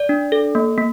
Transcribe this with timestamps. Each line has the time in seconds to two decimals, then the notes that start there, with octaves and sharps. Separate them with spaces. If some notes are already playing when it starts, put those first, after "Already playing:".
Already playing: D5
0.09 D4
0.32 A4
0.55 A#3
0.78 A#3